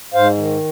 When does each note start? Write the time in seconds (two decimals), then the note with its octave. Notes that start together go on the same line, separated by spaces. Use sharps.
0.14 G#2 C5 F5
0.37 D#3